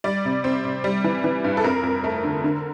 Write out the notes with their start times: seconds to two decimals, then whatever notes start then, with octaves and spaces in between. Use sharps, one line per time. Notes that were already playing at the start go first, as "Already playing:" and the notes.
0.04 G3 D5
0.25 C3
0.44 C4
0.64 C3
0.84 G3
1.04 E3
1.24 E3
1.44 G2
1.57 A4
1.64 F2 A#4
1.83 F2
2.04 A3
2.24 D3
2.44 D3